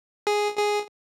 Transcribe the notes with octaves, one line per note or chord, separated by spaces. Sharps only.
G#4
G#4